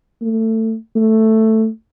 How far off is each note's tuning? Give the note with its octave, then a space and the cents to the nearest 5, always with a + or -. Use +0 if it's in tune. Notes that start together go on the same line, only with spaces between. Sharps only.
A3 +20
A3 +5